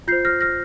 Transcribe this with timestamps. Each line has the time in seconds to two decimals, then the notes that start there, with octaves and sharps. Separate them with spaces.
0.08 F4 C5 G6 C7
0.25 F6 A#6
0.41 F6 A#6